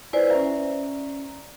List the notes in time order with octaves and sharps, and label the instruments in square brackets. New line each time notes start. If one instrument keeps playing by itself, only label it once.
[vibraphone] E4 B4 C5 [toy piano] D5 G#5
[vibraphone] C#4 A#5 [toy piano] E5